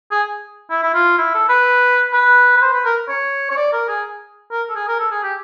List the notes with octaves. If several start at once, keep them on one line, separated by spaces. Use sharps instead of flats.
G#4
E4
E4
F4
E4
A4
B4
B4
B4
C5
B4
A#4
C#5
C#5
D5
A#4
G#4
A#4
A4
G#4
A#4
A4
G#4
G4